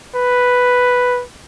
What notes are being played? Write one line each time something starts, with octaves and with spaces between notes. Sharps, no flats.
B4